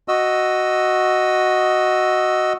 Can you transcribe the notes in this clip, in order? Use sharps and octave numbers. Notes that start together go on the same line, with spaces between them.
F#4 D#5 E6